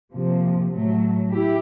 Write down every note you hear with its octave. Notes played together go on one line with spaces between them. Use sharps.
C3 F3 A#3
A2 F#3 A3
E4 G4